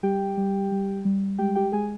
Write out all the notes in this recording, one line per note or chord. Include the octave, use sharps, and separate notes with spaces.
G3 G4 G5
G3
G3
G3
G#3 G4 G5
G4 G5
G#3 G#4 G#5